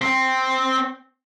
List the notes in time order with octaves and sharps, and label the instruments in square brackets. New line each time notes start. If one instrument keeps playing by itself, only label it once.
[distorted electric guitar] C4